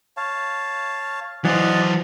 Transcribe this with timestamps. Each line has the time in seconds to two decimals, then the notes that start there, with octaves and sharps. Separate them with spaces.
0.17 C#5 F5 A5
1.45 E3 F#3 C5 D5 D#5 F#5